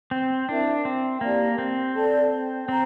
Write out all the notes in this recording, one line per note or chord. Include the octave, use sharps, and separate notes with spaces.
C4
D4 E4 A#4 E5
C4
A#3 E4 G4 D5 A5
C4
A4 D5 A5
C4 C5 G5 A#5